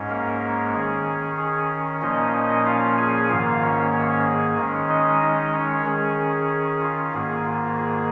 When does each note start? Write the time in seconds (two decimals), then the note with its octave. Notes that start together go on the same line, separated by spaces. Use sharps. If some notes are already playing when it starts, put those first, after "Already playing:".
Already playing: G#2 G#3 C#4
0.10 A#3 A#4
0.74 D#3 C#4 G#4
1.37 G#4
2.01 A#2 F3 A#3 C#4 D#4 D#5
2.33 D#4 D#5
2.65 F4 F5
2.98 G#4 G#5
3.29 G#2 D#3 A#3 F4 F5
3.61 C#4 C#5
3.93 C#4 C#5
4.26 G#4
4.58 D#3 G#3 C#4
4.89 D#4 D#5
5.21 D#4 D#5
5.53 C#4 C#5
5.85 D#3 C#4 G#4
6.81 F4
7.13 G#2 D#3 A#3 G#4
7.45 F4
7.77 G#4